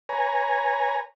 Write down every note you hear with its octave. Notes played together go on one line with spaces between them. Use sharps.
B4 C#5 G#5 A#5